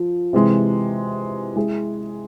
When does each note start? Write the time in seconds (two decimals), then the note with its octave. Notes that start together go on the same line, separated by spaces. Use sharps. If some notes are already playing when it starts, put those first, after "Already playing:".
Already playing: F3
0.33 C3 E3 G#3
1.56 G#3 E4 G#4